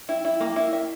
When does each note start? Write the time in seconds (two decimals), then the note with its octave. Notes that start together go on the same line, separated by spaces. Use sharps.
0.09 E4
0.25 E4
0.40 A#3
0.56 E4
0.73 E5